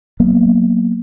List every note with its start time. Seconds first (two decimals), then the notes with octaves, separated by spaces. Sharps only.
0.20 F#3 A#3 B3